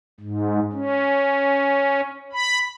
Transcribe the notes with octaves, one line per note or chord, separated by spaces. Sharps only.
G#2
C#4
B5